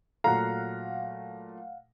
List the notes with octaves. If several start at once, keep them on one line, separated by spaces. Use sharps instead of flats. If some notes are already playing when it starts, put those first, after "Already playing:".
A#2 F#3 A3 F5 F#5 A#5